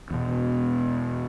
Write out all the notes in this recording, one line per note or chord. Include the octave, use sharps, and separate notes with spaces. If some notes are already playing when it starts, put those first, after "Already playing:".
E2 B2